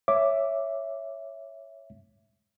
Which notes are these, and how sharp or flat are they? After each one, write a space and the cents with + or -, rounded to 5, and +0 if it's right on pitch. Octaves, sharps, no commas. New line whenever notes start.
C#5 +0 E5 +5 D6 +0